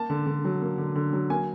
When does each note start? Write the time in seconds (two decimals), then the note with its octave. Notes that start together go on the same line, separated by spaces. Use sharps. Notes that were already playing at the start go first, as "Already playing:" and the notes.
Already playing: A#3 A5
0.10 D3
0.26 D3
0.45 F#3
0.62 A#3
0.78 D3
0.95 D3
1.13 F#3
1.30 A#3 G#5